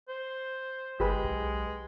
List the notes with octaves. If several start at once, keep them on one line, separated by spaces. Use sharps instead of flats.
C5
G1 G#3 G4 G#4 B4
B1